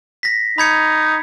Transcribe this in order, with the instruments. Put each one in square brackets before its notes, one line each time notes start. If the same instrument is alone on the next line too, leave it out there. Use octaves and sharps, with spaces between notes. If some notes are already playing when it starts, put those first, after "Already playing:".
[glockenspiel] A#6 B6
[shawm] D#4 [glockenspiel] B5 G#6 C#7